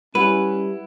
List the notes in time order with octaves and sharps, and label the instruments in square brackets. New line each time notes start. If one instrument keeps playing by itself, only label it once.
[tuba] G3 [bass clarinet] C#4 [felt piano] E4 F#5 [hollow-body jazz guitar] B4